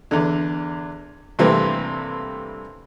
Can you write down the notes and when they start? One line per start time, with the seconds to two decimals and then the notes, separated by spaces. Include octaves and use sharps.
0.11 E2 D3
1.39 G2 C3 E3 A3 A#3 C4